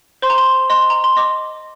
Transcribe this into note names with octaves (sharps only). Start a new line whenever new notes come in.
C5 C6
A#5
C6
D#5 C6
A#5
C6
D#5 D6